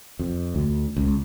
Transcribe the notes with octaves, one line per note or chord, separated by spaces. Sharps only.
F2
D2
C#2